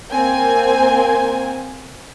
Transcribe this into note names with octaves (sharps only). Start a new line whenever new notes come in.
A#3 C4 G#5